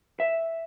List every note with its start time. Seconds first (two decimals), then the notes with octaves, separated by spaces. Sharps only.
0.20 E5